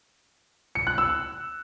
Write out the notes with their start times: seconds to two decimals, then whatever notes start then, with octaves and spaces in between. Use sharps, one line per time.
0.75 C#7
0.87 F#6
0.98 E6